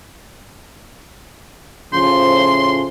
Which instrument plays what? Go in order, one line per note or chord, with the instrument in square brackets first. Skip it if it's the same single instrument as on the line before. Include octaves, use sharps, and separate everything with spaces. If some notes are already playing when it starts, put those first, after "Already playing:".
[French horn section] A2 C#3 F3 [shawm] C6